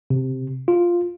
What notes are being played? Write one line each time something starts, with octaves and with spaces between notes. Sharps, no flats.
C3
F4